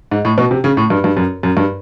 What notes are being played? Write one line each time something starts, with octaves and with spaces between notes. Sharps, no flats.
G#2
A2
B2
C3
C#3
A2
G2
G2
F#2
F#2
G2